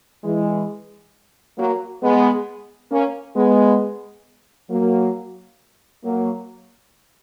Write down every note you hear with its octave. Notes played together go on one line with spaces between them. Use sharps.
E3 G#3
F#3 A#3
G#3 B3
A#3 C#4
G#3 B3
F#3 A#3
F#3 A#3